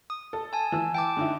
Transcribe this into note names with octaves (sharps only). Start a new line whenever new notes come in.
D#6
A4
G#5 A5
E3 E6
G5 A5 D6
D3 D#4 E4